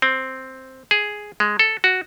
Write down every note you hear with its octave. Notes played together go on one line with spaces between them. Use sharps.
C4
G#4
G#3
A4
F#4